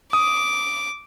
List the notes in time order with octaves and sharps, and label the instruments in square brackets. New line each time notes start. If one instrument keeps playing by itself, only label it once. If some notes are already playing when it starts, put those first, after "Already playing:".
[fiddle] D6 [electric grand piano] D#6